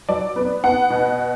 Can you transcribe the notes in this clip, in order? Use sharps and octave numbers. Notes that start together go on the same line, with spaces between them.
F#3 D5
B3
B3 F#5
B2